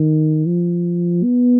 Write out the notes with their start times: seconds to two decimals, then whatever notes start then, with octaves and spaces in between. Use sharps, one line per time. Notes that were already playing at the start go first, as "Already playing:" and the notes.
Already playing: D#3
0.46 F3
1.23 B3